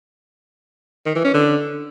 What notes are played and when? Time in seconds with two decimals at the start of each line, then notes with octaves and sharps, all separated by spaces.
1.06 D#3
1.15 E3
1.25 C#4
1.34 D3